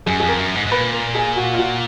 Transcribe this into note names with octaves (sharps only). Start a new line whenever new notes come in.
F#2 G#4
F2 G#4
A#4
F#2
G#2
G#2
A#2 B4
A#4
G#4
F#4
F4
F#4